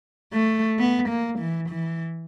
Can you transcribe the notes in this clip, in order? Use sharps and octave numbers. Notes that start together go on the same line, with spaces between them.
A3
B3
A#3
E3
E3